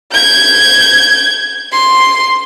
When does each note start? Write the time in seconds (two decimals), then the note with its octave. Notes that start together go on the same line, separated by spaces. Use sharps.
0.13 G6 G#6
1.72 C6